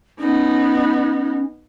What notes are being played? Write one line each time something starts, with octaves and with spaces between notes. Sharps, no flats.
B3 C#4 D#4